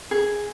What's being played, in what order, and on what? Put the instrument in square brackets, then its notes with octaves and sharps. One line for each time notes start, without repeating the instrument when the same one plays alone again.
[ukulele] G#4